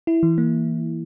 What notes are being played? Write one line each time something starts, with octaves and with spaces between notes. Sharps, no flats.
E4
E3
A#3